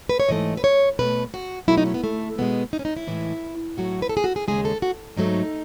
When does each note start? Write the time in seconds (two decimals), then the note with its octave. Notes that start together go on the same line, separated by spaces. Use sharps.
0.09 B4
0.20 C#5
0.29 G#2 E3 A3 D#5
0.57 B4
0.64 C#5
0.99 B2 A3 B4
1.34 F#4
1.68 B2 F#3 A3 E4
1.78 D#4
1.86 C#4
1.94 B3
2.04 A3
2.38 B2 G#3 B3
2.73 D#4
2.79 C#4
2.85 D#4
2.97 E4
3.07 A2 E3 G#3
3.77 A2 F#3 A3 F#4
4.02 B4
4.09 A4
4.17 G#4
4.24 F#4
4.36 G#4
4.48 D#2 C#3 G#3 G#4
4.65 A4
4.82 F#4
5.17 G#2 F#3 A3 D#4